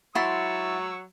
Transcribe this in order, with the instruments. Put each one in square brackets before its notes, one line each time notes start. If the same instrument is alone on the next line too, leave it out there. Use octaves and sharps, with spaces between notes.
[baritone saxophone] F#3 [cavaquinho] E4 C6 [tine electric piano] F#5 A6 [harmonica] C#6 E6